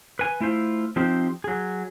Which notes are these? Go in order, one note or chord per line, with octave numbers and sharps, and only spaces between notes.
B4 G#5
A3 E4 F4 C5
F3 C4 D#4 G4 C5
F#3 G#4